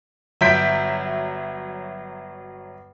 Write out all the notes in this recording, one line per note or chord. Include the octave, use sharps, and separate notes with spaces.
G1 F#3 E5 G6 B6 D7